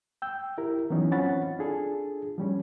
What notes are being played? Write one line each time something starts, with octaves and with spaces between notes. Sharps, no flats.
G5 E6 G6
E4 G4 A#4
E3 F#3 B3 C#4 D#4
C4 C#4 F4 F#5 B5 A6
D4 F4 G#4 A4
F3 G3 C#4